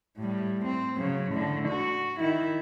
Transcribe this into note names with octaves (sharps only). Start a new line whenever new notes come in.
A2 G3
C4
C#3 F#3
A2 D3
F#4
D#3 E4